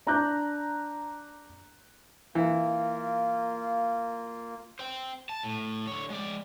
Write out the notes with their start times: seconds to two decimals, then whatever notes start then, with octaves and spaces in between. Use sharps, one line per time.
0.07 D4 A#5 D6 F#6 G6
2.35 E3 A#3 F4
4.79 C5 G5
5.29 A5
5.43 A2
5.87 D3 C#5
6.10 G#3 D5